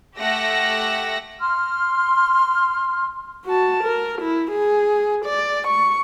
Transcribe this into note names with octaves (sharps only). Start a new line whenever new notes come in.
A3 G4 F#5 E6 A#6
C6 F6
F#4 A5
A#4
E4
G#4
D5
C#6